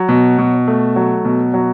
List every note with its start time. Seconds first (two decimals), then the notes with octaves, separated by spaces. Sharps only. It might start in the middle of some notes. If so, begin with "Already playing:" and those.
Already playing: F#3
0.09 B2
0.38 B2
0.68 A3
0.96 F#3
1.25 B2
1.54 F#3